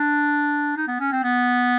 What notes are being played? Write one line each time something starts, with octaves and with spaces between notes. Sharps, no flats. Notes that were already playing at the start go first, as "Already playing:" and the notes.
Already playing: D4
D#4
B3
C#4
C4
B3